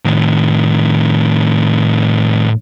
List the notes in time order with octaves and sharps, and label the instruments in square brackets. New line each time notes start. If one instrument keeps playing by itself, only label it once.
[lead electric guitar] A2 D#3